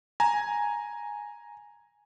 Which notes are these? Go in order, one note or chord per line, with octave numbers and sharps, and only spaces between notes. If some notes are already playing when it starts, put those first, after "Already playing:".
G#5 A#5